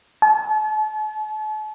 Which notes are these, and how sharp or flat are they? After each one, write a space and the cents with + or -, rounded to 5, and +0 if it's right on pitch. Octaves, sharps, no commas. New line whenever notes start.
A5 -40